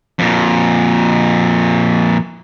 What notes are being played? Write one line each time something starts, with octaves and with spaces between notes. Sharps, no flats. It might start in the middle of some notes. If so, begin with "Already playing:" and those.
F2 A#2